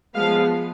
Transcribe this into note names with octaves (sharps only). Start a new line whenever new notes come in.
F3 G#3 B3 F5